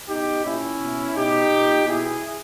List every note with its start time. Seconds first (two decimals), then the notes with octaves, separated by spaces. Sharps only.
0.08 B2 D#4 G4
0.44 A#2 C#4 E4
0.79 B2
1.15 B2 D#4 G4
1.50 A#2
1.86 B2 E4 G#4